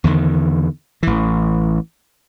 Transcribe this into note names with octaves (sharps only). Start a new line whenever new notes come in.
E2 D3 D#3
A1 E3